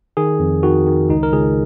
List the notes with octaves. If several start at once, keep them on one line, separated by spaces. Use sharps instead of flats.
D#3 G#4
F2
D#3 F#4
D#3
C#2 D#4
A#4
C#2 G#4